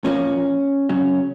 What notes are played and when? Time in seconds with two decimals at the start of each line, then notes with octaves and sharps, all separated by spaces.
0.04 A#2 F3 A#3 C#4
0.89 C#3 F#3 C#4